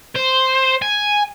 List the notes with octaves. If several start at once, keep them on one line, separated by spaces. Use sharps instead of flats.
C5
G#5